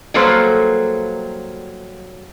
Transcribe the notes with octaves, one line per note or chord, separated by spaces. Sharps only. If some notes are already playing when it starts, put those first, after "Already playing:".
F#3 G3 A#3 A4 B4 C5